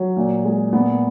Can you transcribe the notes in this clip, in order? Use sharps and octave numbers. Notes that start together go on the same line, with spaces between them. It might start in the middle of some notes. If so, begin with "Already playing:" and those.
Already playing: F#3
A#2
G#3
A#2 B3